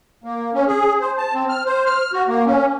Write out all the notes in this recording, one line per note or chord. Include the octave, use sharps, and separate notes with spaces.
A#3
C#4
G#4
C5
A5
C4
F6
C5
F6
F#4
A#3
C#4